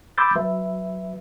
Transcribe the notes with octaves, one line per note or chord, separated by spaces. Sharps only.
B5 C6 D6 E6 G6 A6
F#3 B4 E5